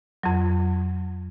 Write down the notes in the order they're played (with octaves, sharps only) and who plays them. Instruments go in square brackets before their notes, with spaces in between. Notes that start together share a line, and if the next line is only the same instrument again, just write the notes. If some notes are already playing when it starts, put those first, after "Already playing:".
[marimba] F2 F#3